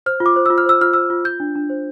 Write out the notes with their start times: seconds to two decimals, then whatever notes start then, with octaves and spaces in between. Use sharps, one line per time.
0.06 C5 F6
0.20 F4
0.26 D6
0.36 C5
0.46 F4 E6
0.58 F6
0.66 C5 E6
0.81 F4 F6
0.93 C5 E6
1.10 F4
1.25 F4 G6
1.40 D4
1.55 D4
1.70 C5